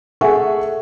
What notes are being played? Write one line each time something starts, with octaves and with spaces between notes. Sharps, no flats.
G#4 A4 E5 F#5 G#5 C#6